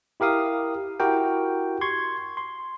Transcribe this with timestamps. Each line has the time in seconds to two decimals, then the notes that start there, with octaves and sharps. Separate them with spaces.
0.20 E4 G4 A#4 F5 D#6
1.00 E4 F#4 G4 A#4 G5
1.81 C6 C#6 G#6
2.37 C6